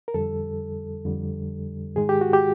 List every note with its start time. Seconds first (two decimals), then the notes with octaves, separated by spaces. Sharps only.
0.08 A#4
0.14 F2 D3 G3 A4
1.05 F2 D3 G3
1.96 G#2 D#3 G#3 G#4
2.09 G4
2.21 F#4
2.33 G4